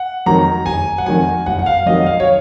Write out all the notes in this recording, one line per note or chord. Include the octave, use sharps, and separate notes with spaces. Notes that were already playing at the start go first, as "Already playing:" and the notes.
Already playing: F#5
F2 D#3 F#3 A#5
F#1 G#5
F#5
F2 D#3 F#3 G#5
F#1 F#5
F#5
F5
F2 D#3 F#3 D#5
F5
C#5